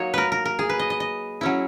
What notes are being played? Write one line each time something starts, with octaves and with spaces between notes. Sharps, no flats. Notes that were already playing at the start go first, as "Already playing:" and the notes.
Already playing: F#3 A#3 D#4 C#5
A#4 B4
A#4
A#4
G#4
B4
D#5
D#5
D#5
F#3 C#4 E4